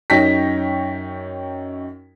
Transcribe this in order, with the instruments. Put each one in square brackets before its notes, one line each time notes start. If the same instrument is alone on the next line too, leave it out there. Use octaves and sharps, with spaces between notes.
[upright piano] F#2 D#4 C#5 G5 A#6 B6